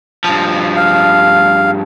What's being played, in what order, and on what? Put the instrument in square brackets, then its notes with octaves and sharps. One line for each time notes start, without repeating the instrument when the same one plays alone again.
[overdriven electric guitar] G2 F3
[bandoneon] F5